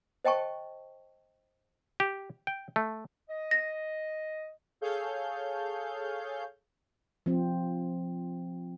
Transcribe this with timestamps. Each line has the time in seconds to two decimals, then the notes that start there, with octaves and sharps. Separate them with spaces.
0.25 C5 D#5 G5 A5 C#6
2.00 G4
2.47 G5
2.76 A3
3.30 D#5
3.51 A#6
4.81 G#4 A4 C#5 F5 G6
7.26 F3 C4